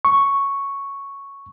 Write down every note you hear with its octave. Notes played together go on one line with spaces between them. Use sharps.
C#6